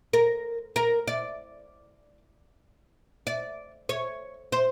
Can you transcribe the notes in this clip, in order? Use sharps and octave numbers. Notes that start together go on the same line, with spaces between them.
A#4
A#4
D5
D5
C#5
C5